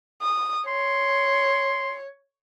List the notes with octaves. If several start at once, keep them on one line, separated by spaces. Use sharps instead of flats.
D#6
C#5 C6